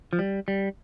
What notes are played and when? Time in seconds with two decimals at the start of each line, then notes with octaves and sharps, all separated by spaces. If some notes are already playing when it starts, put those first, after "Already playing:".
0.13 F3
0.19 G3
0.48 G3